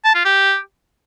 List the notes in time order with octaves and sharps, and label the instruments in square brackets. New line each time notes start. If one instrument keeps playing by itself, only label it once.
[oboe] A5
F4
G4